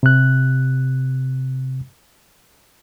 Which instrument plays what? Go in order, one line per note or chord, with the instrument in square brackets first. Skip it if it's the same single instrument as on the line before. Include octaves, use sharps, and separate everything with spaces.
[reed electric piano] C3 F#6